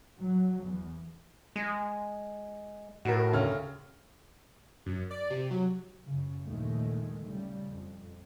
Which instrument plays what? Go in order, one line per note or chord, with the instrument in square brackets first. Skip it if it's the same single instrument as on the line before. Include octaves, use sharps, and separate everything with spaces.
[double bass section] F#3
E2
[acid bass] G#3
[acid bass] A2 [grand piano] F#4 A#4
[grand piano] D2 C#3 F6
[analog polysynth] F#2
D5
C3
F#3
[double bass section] F#2 C#3
A#1 D#2 D#3 G#3 A3
C#3 G3
F2